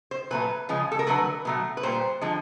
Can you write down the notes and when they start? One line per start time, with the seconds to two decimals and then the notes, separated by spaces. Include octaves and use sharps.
0.11 C5
0.31 A#2 F#3 A3 B4
0.69 C#3 F3 G#3
0.92 A4
0.99 A#4
1.07 D3 F#3 A3 B4
1.45 B2 F#3 A3
1.77 B4
1.83 A#2 G3 C5
2.21 D3 F3 G#3